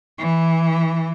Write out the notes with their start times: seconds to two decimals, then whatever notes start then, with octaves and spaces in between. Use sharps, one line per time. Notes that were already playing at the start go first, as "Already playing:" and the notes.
0.18 E3